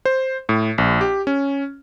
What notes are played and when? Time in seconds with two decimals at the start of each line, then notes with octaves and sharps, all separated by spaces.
0.05 C5
0.49 A2
0.78 A#1
1.01 G4
1.27 C#4